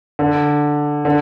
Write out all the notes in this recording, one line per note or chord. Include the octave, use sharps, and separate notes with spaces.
D3
D3